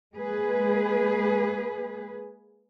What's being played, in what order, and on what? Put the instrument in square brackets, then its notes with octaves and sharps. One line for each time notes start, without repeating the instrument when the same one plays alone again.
[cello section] G#3 A#3 G#4 B4